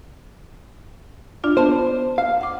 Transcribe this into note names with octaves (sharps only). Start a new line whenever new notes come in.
D4 F4 D5
B3 C5 A5
F5
F#5 D6